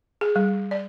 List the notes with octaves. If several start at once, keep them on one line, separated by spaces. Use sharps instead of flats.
G#4
G3
D5